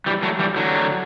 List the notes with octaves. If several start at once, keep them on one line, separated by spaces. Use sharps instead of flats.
E3 G3
F#3 A3
E3 G3
D3 F#3